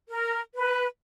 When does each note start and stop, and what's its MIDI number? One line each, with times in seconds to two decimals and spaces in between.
0.09 0.40 70
0.55 0.86 71